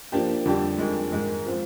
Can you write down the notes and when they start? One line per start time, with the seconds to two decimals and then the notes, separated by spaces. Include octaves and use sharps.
0.12 F3 A#3 D4 G4
0.45 F2 D3 G3 D4 G4
0.78 F2 D#3 G#3
1.12 G#2 D#3 G#3
1.46 F3 C4 F4